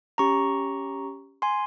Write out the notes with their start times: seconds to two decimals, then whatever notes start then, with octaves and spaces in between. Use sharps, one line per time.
0.18 C#4 G4 A#5 C#6
1.42 G#5 C6